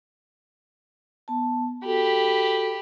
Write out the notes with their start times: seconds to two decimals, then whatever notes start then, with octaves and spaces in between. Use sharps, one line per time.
1.28 B3 A5
1.85 F#4 G4 A4 B5